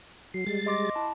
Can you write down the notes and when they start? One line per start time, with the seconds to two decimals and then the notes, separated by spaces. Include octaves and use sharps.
0.34 F#3 C7
0.47 G3 G#3 A6
0.66 D#5 C6 D6
0.95 E4 A5